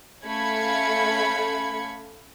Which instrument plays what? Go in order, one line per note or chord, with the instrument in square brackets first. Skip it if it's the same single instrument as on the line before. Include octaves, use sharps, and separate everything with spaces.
[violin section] A3 C#4 F5 B5 G#6 C#7